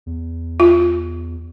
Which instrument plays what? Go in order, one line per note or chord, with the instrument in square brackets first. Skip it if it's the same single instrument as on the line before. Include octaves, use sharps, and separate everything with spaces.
[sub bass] E2
[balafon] F4